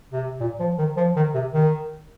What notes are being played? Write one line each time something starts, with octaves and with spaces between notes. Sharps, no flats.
C3
A#2
F3
D#3
F3
D#3
C3
D#3